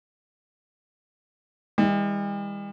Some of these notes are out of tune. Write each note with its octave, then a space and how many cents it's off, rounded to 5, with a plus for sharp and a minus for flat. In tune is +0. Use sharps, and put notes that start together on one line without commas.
E3 -45 G3 +45